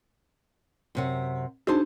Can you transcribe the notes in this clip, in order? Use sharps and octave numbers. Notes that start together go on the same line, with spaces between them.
F#2 C3 F#5
D4 D#4 F#4 G#4 C5 A5